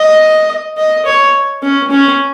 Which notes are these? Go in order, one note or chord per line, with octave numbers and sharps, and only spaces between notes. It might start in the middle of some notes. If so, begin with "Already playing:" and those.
Already playing: D#5
D#5
C#5
C#4
C#4